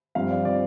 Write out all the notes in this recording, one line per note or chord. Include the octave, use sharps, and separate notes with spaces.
G2 F3 C4 F5
D5
F3 C4 D5